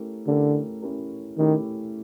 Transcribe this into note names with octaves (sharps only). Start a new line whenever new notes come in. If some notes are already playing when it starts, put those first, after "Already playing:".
Already playing: A3 C#4 E4 G4 A#4
D3 A3 C#4 E4 G4 A#4
A3 C#4 E4 G4 A#4
D#3 A3 C#4 E4 G4 A#4